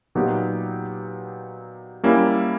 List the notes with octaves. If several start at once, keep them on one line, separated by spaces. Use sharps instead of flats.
A#2 F#3 B3 D#4 G4
G3 A#3 C#4 E4